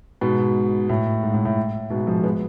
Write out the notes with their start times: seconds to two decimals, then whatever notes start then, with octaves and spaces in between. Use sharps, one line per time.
0.21 G#2 B2
0.89 A2
1.23 G#2
1.34 A2
1.45 A2
1.90 G#2 B2
2.07 F3 G#3
2.24 G#3 B3